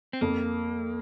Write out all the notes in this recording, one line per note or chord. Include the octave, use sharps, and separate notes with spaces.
C4
F2 A#3